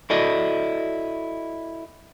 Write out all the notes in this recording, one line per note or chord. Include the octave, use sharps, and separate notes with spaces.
E4 F#4 A4 D5 D#5